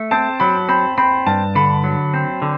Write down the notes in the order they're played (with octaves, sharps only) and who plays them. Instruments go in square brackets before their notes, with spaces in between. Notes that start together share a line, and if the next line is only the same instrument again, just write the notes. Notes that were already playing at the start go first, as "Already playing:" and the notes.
Already playing: [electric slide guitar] A3
[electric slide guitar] C4 [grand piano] A5
[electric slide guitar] F#3 [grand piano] B5
[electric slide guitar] C4 [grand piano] B5
[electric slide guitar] C4 [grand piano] B5
[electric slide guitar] G2 [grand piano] A5
[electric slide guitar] D3 [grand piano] B5
[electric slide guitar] F#3
C4
D3